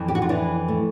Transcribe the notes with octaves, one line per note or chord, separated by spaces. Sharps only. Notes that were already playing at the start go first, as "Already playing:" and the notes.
Already playing: F2 E3
G4
F#4
F4
E3 D4 E4
A3